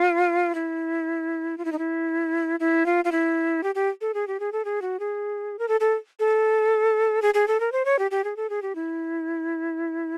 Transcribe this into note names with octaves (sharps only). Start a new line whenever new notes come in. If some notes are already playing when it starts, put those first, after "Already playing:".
Already playing: F4
E4
F4
E4
D#4
E4
E4
F4
F4
E4
G4
G4
A4
G#4
G4
G#4
A4
G#4
F#4
G#4
A#4
A4
A4
A4
G#4
G#4
A4
A#4
C5
C#5
G4
G4
G#4
A4
G#4
G4
E4